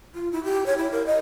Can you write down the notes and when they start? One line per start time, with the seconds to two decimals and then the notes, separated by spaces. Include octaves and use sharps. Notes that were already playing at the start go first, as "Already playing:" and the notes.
0.15 F4
0.32 E4
0.44 G4
0.66 C#5
0.78 E4
0.92 A#4
1.07 D#5